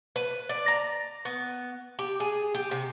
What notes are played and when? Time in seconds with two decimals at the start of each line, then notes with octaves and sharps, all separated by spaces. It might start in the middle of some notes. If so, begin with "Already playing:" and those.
0.16 B4
0.49 D5
0.68 A#5
1.25 B3
1.99 G4
2.20 G#4
2.54 G4
2.71 C3